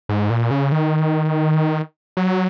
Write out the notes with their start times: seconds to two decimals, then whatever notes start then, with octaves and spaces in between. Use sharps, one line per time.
0.09 G#2
0.30 A#2
0.51 C#3
0.72 D#3
2.17 F#3